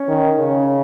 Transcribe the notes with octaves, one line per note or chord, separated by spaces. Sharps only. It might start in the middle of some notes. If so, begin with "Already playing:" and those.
Already playing: C#4
D#3
C#3 C#4